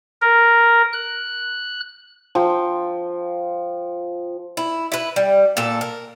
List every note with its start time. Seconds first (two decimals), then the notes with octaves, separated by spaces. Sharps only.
0.22 A#4
0.93 F#6
2.35 F3 G5
4.57 E4
4.92 E4 B4
5.16 G3
5.57 A#2 A4
5.81 A#4